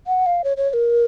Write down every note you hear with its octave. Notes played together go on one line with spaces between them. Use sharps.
F#5
F5
C#5
C#5
C#5
A#4